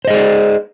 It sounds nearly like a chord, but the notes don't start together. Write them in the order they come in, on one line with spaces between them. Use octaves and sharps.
C5 D#5 G#4 D5